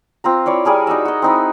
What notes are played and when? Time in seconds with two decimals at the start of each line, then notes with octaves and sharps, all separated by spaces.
0.24 C4 F4 A#5
0.46 E4 C#5 D5 F5
0.65 G3 G#4 A#4 G#5
0.87 D#4 F#4 D#5 E5
1.05 F#4 D#5
1.22 C4 D#4 E4